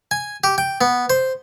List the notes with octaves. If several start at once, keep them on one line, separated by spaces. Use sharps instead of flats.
G#5
G4
G5
B3
C5